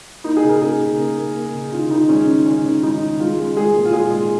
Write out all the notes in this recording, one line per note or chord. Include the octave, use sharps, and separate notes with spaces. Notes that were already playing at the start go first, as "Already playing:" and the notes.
A#3 D#4
G#4
C#3
A#4
A#3 G#4
C#3
A#3
A#3
A#3
C#3
D#3 F4
D#3 D#4
G#3 C#4
D#3
D#3 C#4
D#3
G#3 D#4
D#3
G#3 F4
G#3
G#3 G#4
A#2
F4
G#3 G#4
G#3